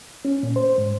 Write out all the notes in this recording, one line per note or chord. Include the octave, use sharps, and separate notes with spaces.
C#4
A#2
C5
G#2